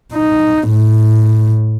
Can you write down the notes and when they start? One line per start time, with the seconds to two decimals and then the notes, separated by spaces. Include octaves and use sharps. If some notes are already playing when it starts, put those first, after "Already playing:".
0.14 D#4
0.69 A2